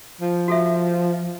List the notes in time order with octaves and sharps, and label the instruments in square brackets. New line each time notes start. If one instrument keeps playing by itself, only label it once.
[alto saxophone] F3
[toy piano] F#4 A4 E5